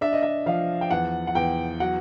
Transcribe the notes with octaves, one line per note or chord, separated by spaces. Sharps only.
D4 E5
D#5
E5
F3 F5
G5
E2 F#5
F#5
E2 G5
F#3 F#5